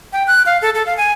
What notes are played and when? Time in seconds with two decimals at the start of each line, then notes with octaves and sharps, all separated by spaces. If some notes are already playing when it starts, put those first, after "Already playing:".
0.13 G5
0.27 F#6
0.46 F5
0.62 A4
0.75 A4
0.86 F5
0.97 G#5